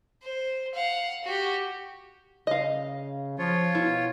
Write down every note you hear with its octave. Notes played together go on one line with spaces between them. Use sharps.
C5
F5 F#5
F#4 G4
C#3 D#5 F5
F3 F4 C#5
B2 E4